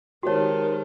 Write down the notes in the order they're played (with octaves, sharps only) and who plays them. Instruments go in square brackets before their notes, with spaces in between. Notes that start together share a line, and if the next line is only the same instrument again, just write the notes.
[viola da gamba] D#3 G#3 [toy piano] F#4 C#5 [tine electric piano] G4 C5 A5 [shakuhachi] A#4